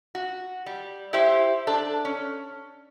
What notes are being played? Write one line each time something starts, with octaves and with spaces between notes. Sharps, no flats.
F#4
G3
E4 G4 C5 E5
D4 A4
C#4